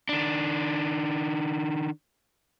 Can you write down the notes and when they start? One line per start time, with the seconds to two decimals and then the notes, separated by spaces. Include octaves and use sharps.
0.09 D#3 D4